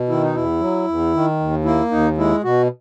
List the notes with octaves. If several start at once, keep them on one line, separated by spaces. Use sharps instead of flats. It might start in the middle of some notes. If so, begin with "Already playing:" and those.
Already playing: B2
D#3 E4
D#4
E2 E4
F#3
E2
D#3
D#2
A#3 E4
D#2 D#4
G#3 E4
B2 F#4